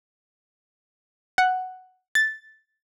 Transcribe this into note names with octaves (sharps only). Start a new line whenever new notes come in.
F#5
A6